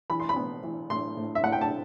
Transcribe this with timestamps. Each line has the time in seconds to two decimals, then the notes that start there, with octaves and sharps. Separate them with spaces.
0.10 E3 B5
0.20 C6
0.29 B5
0.36 B3
0.64 E3
0.90 A2 C6
1.17 A2
1.35 E5
1.43 A2 F#5
1.53 G5
1.61 A5